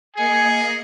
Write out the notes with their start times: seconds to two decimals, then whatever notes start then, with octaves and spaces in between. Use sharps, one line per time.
0.17 A#3 G#4 D#5 G#5 C#7